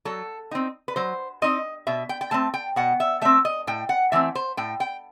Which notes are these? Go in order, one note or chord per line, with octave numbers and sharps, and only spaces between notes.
F#3 A4
C4 D#4
B4
F#3 C5
C4 D#4 D#5
B2 E5
G5
G5
A3 C4 A5
G5
B2 F#5
E5
A3 C4 E5
D#5
A2 G5
F#5
E3 A3 C4 E5
C5
A2 G5
G5